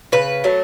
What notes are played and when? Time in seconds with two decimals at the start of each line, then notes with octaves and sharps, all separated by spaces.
0.12 C#3 B4
0.44 F#3 A3